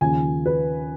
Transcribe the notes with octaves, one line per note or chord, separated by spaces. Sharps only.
D#2 C#3 F3 G#5
B4